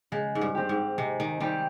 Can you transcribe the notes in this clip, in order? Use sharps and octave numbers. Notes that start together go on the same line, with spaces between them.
C#3 G#3
G#2
G2
C4 G4
G#2
C3 G#3
D#3
D#3 G3 C4 G4